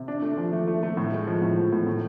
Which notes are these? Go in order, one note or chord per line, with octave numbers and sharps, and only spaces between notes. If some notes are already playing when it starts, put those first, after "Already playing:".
Already playing: C3
D4
A3
F3
A3
A3
A3
A2
G#3
F3
A2
F3
A2
A2